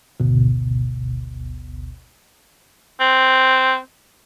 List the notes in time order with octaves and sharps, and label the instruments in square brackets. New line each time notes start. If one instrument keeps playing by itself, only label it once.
[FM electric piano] G#1 D2 B2
[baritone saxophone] C4